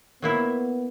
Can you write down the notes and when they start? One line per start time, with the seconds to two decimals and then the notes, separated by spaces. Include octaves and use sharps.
0.22 F#3 A#3 B3 E4